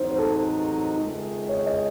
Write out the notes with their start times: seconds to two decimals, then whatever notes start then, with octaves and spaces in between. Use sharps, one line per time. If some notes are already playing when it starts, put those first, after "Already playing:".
Already playing: A1 G#2 F#3 C4 D#4 C5
0.11 C5
0.18 A4
0.97 C#2 C3 D#3 G#3
1.49 C#5
1.66 D#5